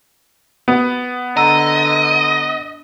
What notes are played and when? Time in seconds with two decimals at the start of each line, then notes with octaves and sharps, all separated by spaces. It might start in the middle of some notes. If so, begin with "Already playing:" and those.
0.68 B3
1.37 D3 D#5 A#5 E6